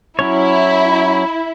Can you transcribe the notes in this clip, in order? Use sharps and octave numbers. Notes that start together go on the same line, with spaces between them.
F#3 C#4 E4 C#5